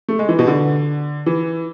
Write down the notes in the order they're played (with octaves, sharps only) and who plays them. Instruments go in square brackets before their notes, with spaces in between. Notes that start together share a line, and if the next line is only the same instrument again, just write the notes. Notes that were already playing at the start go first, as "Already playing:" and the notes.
[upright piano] A3
G#3
E3
B2
D3
E3